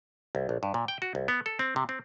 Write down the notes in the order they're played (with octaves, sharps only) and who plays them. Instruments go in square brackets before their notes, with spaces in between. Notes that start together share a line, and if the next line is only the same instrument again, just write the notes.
[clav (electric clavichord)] C2
A#1
G2
A#2
G5
F#4
C2
B3
A4
C4
C3
C4